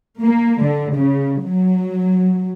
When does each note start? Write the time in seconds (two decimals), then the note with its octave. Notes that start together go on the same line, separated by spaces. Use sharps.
0.24 A#3
0.63 D3
0.95 C#3
1.44 F#3